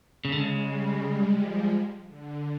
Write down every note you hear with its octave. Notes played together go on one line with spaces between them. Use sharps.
C#3 G#3
D3
C#3
G3
G3
F3
D3